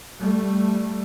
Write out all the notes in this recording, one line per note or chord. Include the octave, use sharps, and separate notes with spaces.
G3 A3